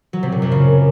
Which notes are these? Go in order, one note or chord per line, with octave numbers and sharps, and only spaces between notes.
F#3
C3
A#2
F#2
C#3